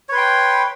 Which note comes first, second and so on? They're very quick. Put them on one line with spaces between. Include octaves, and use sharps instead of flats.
C#5 B4 C6 G5